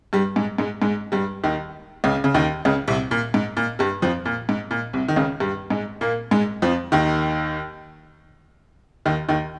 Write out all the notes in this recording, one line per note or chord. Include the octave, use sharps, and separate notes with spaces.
G2 G3
G#2 G#3
G#2 G#3
G#2 G#3
G2 G3
D#2 D#3
C#2 C#3
C#3
D#2 D#3
C#2 C#3
C2 C3
A#2
G#2
A#2
G2 G3
F2 F3
A#2
G#2
A#2
C2 C3
D#3
C#2 C#3
G2 G3
G#2 G#3
A#2 A#3
G#2 G#3
F2 F3
D#2 D#3
D#2 D#3
D#2 D#3